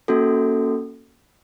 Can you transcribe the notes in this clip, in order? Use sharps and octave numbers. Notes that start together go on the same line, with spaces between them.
A#3 C#4 F#4 A4